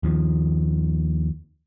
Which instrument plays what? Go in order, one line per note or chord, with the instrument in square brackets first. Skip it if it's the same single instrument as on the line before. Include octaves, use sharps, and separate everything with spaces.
[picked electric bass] D#2 D#3 F3